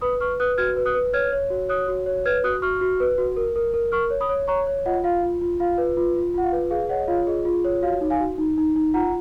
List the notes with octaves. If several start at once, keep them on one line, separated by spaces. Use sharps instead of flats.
B4 B5 D#6
B4 C#6 F6
B4 D#6 F#6
F#4 F6 G#6
B4
D#6 F#6
B4
C#5 F6 G#6
C#5
F#4
C#5 D#6 F#6
F#4
C#5
B4 F6 G#6
F#4 D#6 F#6
F#4 C#6 F6
F#4
B4
F#4
A#4
A#4
A#4
A#4 C#6 F6
C#5
B5 D#6
C#5
C#5 A#5 C#6
C#5
F4 D#5 F#5
F4 F5
F4
F4
F4 F5
B4
F4
F4
F4 F#5
F5
B4
G#4 F5
C#5 D#5 F#5
D#5
F4 F5
G#4 D#5
F4
C#5
F#4 F5
D#4
F5 G#5
F#4
D#4
D#4
D#4
F4 F#5 A#5